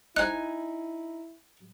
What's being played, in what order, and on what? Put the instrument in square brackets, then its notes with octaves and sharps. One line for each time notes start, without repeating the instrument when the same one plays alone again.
[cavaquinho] D#4 G#5 [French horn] E4 [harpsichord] C5 D#5 [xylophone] F#6